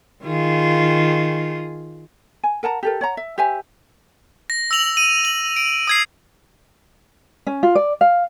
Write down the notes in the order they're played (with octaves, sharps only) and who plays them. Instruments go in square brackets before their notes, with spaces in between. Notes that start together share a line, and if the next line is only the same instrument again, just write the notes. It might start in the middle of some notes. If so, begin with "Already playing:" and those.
[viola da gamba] D#3 F4 G#4
[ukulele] G#5
A#4 F#5 A5 A#5
G4 A4 A#4
C#5 F#5 A#5
E5
G4 C5 E5 G#5
[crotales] A#6
E6 A#6 F7 F#7
D#7
F#7
D7
D#6 G#6 C7
[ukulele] C#4
F4
D5
F5